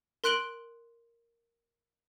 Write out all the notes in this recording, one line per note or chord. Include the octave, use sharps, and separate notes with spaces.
A#4 C6 F#6 D7 F#7 G7